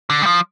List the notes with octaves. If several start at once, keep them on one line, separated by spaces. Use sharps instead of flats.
D3
G3
F3